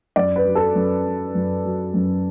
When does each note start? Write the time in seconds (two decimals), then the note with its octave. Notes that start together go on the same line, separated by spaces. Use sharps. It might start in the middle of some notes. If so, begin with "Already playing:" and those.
0.16 F#2 D5
0.36 B4
0.46 F#3
0.55 A4
0.75 F#2
1.05 F#3
1.35 F#2
1.65 F#3
1.94 F#2